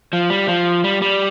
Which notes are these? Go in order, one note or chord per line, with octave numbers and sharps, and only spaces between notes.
F3
G3
F3
G3
G3